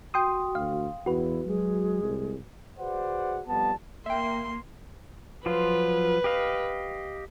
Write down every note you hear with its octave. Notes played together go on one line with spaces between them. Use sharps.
F#4 G5 C6 D#6
D2 F5
E2 E4 F#4 B4
F#3 G#3
C2
F#4 G#4 B4 C5 D5 F#5
F2 G3 B3 A5
A#3 E5 G5 C6
F3 F#3 F4 B4
G4 D#5 F5